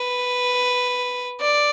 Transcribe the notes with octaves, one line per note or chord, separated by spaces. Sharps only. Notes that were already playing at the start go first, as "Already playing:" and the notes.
Already playing: B4
D5